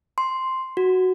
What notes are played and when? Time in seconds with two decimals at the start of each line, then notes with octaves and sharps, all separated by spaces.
0.18 C6
0.77 F#4